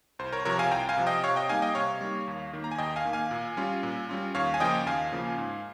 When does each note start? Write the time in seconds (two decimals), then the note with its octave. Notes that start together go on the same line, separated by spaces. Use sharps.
0.19 C2 C5
0.32 A#4 C#5
0.45 C3 F3 A#4 C#5
0.59 F5 G#5
0.71 C2 G5 A#5
0.89 F5 G#5
0.97 C3 F3
1.06 D#5 G5
1.23 C3 C#5 F5
1.36 D#5 G5
1.49 G3 A#3 D#4 F5 G#5
1.62 D#5 G5
1.75 C3 C#5 F5
2.01 G3 A#3 D#4
2.28 D#2
2.53 D#3 A#3
2.64 A#5
2.71 G#5
2.78 D#2 D#5 G5
2.96 F5 G#5
3.05 D#3 A#3
3.13 F5 G#5
3.31 A#2
3.57 G3 C#4 F4
3.83 A#2
4.09 G3 C#4 F4
4.35 D#2 C#5 F5
4.54 G#5
4.60 C#3 F3 A#3 F4 D#5 G5
4.86 D#2 F5 G#5
5.12 C#3 F3 A#3 F4
5.38 G#2